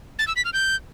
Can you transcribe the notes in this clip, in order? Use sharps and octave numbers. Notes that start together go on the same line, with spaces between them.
A6
E6
B6
F6
G6